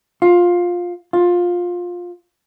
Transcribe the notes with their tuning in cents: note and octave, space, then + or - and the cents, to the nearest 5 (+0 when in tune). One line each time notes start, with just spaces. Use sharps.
F4 +15
F4 +15